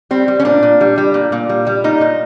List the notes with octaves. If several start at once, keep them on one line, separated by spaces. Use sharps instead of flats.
G3 C4
G3
C#4
A#2 D4
A#2
G3
G3
A#2
A#2
G3
G3
A#2 D#4
A#2